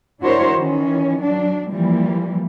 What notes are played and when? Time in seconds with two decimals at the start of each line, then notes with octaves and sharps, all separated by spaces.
0.21 D4 E4 F#4 A#4 C5 C#5
0.55 D#3 E3 C#4
1.20 F#3 D4
1.71 E3 F3 G3 A#3